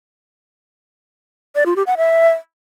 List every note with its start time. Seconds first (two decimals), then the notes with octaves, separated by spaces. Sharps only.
1.55 D5
1.66 F4
1.76 G4
1.87 F#5
1.97 E5